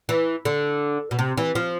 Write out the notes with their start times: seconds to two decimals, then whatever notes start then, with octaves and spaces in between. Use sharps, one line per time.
0.09 E3
0.45 D3
1.11 B2
1.19 C3
1.37 E3
1.55 F3